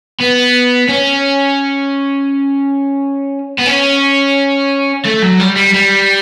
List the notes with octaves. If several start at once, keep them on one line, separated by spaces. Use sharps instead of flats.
B3
C#4
B3
C#4
A3
F#3
G3
G3
G3